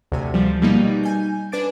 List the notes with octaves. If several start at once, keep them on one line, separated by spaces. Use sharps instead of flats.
D2 C3 G#5
F3 G3
B2 G3 A#3 D#4
G#5 G6
D4 B4 G#5 D6 A6 D7